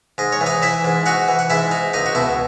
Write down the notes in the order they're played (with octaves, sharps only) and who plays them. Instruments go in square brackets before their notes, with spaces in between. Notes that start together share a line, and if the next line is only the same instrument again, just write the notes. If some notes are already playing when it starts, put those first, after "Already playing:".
[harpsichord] G#2 D#5
C#5
E3
D#4 D#5
E3 E4 E5
G#2
D#4 F#4 F#5
E3
F#5
G#2 E4 E5
D#4
C#2 D#4 D#5
F#4
B2 E4